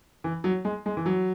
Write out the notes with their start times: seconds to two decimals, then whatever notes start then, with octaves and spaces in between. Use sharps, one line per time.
0.24 E3
0.44 F#3
0.65 G#3
0.86 G#3
0.97 E3
1.06 F#3